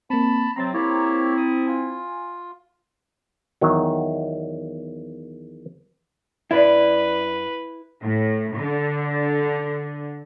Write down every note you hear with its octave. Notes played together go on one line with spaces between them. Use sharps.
A#3 C4 A5 B5
C3 F#3 C4 A#5 C6 A6
A#3 C4 E4 G4 C#5
D#6
F4 G#5
E2 D#3 F#3
F#2 D4 E4 B4
A2
D3